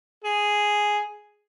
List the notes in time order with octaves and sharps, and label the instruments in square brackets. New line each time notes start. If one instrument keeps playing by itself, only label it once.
[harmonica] G#4